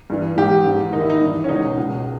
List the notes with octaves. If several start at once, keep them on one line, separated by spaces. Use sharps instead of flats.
G2 E3
G#2 E3 G4
G#2 E3
D#2 D#3 D#4
E4
D#4
G2 E3
C#4
C#2 B2 D#4
C#2 B2